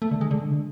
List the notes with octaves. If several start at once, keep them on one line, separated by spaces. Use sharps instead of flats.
A3
D3
G#3
D3